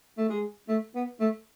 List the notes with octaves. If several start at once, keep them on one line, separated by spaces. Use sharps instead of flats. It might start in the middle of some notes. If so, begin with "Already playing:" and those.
A3
G#3
A3
B3
A3